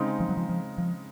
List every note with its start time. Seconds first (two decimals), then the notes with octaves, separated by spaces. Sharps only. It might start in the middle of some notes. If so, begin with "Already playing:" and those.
Already playing: C#3 G#3 C4 D#4
0.20 F3
0.29 F#3
0.37 F3
0.49 F3
0.78 F3